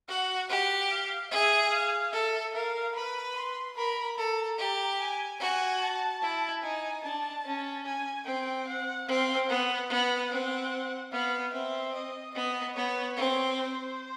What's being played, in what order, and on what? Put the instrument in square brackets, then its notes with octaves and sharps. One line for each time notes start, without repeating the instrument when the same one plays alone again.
[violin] F#4 [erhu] F#5
[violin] G4 [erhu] F#5
[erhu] F5
[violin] G#4 [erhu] E5
[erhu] F5
[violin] A4 [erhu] E5
[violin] A#4 [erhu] F5
[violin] B4 [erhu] B5
[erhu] C6
[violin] A#4 [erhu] B5
[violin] A4 [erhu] A#5
[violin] G4
[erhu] G#5
[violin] F#4 [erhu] G#5
[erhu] A5
[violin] E4
[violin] D#4 [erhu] G#5
[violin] D4 [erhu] A5
[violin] C#4
[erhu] G#5
[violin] C4 [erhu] G5
[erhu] F#5
[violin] C4 [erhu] F5
[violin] B3 [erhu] F#5
[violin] B3 [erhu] F#5
[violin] C4
[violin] B3 [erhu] F5
[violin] C4 [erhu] E5
[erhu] D#5
[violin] B3 [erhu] D#5
[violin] B3 [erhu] C#5
[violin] C4
[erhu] C5